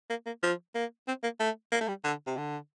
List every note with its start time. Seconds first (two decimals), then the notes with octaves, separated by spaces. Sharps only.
0.10 A#3
0.26 A#3
0.43 F3
0.75 A#3
1.08 C4
1.23 A#3
1.40 A3
1.72 A#3
1.81 A3
1.88 G3
2.04 D3
2.27 C3
2.37 D3